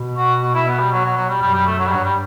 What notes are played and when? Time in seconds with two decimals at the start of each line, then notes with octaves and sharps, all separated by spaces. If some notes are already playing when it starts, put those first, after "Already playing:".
Already playing: B2
0.17 F#4
0.42 F#4
0.54 E4
0.67 B3
0.79 G3
0.91 F#3
1.05 F#3
1.16 F#3
1.29 G3
1.41 F#2 G3
1.54 G3
1.67 A3
1.79 F#3
1.86 G3
1.91 G2 F#3
2.04 G3